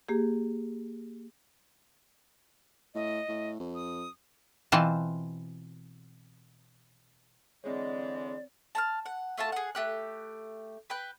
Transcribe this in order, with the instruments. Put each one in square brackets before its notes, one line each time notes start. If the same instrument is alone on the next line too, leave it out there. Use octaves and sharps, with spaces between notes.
[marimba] A#3 G4 G#4
[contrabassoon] A2 [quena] D#5
[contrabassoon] A2
F2
[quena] D#6
[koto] B2 E3 C4 F4 A5
[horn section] D3 E3 G#3 [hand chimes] C4 C#5 [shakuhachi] D5
[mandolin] A5 A#5 F6
F#5
A3 F4 F#4 A5
G#4 F#5
A3 G4 F#6
B4 G5 F#6